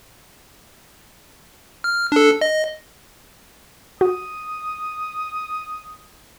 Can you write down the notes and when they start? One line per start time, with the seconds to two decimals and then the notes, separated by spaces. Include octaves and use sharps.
1.84 F6
2.12 D4 A4
2.41 D#5
4.01 F#4 D#6